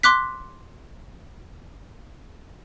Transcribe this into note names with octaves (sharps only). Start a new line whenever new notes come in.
C6 D6 F#6 B6